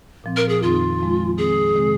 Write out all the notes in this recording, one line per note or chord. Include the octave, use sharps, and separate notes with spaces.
A#2 F3 C4
A#4
G#4
F2 D#3 C4 D#4 F4
F2 F3 G#3
F2 D#3 C4 G#4
C3 D#3 G#3 C4